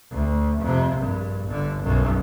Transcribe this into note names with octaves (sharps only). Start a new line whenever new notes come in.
D2
F2 C3
A#1 G2
G1 D3
B1 F#2